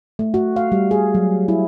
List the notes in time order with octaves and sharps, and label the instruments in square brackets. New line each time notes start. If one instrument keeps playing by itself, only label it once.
[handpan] A3
F#4
F5
G3
G#4
F#3
E4